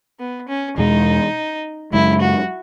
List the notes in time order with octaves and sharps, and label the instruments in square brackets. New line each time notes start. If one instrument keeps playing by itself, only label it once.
[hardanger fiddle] B3
C#4
[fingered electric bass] E2 B2 G#3 [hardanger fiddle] D#4
[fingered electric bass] F#2 C#3 G#3 [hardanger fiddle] E4
[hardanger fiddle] F#4